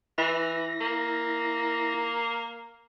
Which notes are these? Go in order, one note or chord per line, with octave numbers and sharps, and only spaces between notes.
E3 E4 A#6
A#3